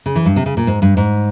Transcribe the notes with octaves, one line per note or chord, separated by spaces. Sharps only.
C#3
E3
G2
C3
C#3
A#2
G#2
G2
G#2